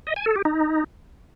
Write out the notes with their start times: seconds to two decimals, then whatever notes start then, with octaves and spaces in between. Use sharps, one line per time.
0.07 D#5
0.16 G#5
0.26 A4
0.36 G4
0.45 D#4